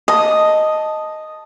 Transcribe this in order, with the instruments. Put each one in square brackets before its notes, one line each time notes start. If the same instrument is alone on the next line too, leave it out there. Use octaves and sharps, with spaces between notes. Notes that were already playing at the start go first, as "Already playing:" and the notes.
[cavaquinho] D#5 [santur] A5 D#6